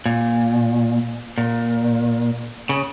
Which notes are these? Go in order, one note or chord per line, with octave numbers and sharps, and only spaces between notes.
A#2
A#2
C#3